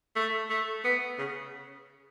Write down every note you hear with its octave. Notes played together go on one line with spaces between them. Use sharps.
A3
A3
B3
C#3